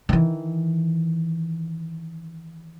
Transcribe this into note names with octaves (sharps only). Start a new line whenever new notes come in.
D#3 E3